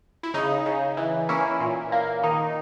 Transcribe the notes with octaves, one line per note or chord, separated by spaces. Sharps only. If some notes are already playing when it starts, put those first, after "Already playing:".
E4
C#3 D#4
C#3
E3
A#3 C#4 E4
A#2
A#3
D#3 D#4